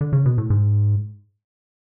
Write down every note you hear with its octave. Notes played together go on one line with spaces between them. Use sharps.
D3
C#3
B2
A2
G#2